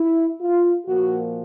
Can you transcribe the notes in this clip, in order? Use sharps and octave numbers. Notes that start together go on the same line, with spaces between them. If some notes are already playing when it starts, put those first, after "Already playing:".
Already playing: E4
F4
A#2 F3 A#3 F#4